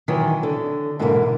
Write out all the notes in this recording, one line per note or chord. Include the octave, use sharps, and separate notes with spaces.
D#3 E3 F#3
D3
G#2 B2 D3 E3 G#3 A#3